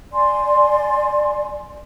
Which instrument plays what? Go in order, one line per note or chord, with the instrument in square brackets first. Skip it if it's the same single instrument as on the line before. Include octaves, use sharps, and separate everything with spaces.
[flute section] D5 G#5 C6